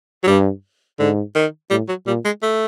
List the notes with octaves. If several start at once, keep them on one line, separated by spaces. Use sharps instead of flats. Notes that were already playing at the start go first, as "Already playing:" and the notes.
F#3
G2 G3
G#2 D3
D#3
A2 G3
F#3
A#2 G3
G#3
A3